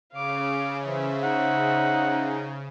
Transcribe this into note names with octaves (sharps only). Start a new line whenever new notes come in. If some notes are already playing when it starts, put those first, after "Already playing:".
C#3 F5 D6
E3 C5 E5
D#4 F#5